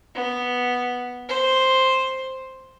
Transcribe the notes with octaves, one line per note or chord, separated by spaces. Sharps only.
B3
C5